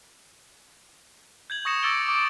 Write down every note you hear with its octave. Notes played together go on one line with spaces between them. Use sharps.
G6 G#6 F#7
C#6 D#6 A#6 C#7 E7
D6 E6 A6 C#7 D7 G7
D6 D7